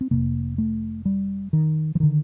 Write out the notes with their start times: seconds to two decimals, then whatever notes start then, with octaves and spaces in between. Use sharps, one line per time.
0.01 C4
0.11 F1 F2 C3 A#3
0.58 A3
1.05 G3
1.53 D#3
1.95 F3
2.00 D3 D#3